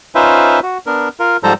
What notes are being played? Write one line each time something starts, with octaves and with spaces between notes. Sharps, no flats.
C#4 D#4 F4 B4 C5 E5
F#4
B3 D4 A#4
F4 A#4
G#2 F3 G3 A4 C5 A#5